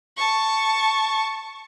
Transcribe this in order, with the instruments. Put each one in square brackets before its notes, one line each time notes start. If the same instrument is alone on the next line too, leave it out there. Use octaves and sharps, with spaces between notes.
[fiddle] A5 C#6